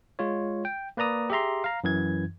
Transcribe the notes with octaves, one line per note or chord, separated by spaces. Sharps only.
G#3 F4 C#5
G5
A#3 B4 D5 A#5 D#6
G4 G#4 E5 A#5 C6
F5 A#5
F#2 E3 G#6